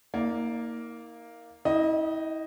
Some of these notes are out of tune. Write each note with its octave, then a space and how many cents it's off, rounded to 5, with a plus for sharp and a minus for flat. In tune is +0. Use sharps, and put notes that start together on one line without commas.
A#3 +0 D#4 +45 D5 +0
E4 -40 D#5 +0 G5 -25